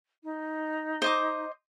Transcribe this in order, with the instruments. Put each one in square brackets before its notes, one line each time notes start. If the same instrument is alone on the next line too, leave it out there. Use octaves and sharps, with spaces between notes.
[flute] D#4
[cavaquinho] C5 D#5 D6